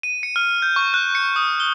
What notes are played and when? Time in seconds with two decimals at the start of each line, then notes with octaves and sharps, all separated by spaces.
0.03 D#7
0.23 C#7
0.36 F6
0.62 G6
0.76 C#6
0.94 F#6
1.15 C#7
1.36 D#6
1.60 G7